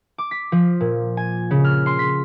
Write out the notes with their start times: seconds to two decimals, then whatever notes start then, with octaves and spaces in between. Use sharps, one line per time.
0.18 D6
0.31 B6
0.52 F3
0.80 A#2
1.17 G#5
1.51 C#3
1.65 F6
1.86 C6
1.99 B6